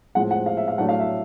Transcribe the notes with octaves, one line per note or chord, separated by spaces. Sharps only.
A2 F3 G#3 C4 F#5
F#5
F5
E5
F5
A2 F#3 A3 D4 F#5
F5
E5